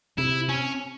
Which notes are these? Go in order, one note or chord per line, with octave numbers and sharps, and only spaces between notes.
C3 E4
C#4